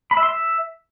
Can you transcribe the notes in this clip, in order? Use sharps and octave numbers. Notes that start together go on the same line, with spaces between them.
B5
E5
C6
E5